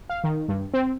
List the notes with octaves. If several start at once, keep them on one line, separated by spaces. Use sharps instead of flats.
F5
D#3
G2
C4